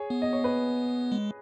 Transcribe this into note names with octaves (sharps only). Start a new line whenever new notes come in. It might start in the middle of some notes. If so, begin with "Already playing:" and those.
Already playing: G#4 C#5
B3
D#5
C#5
B4
G#3